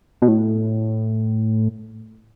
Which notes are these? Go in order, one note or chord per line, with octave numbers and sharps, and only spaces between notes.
B2
A2